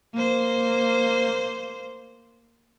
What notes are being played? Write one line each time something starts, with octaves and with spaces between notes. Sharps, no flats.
A#3 C5